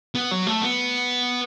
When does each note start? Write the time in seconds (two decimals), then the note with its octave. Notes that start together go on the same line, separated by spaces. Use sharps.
0.15 B3
0.31 F#3
0.47 A3
0.62 B3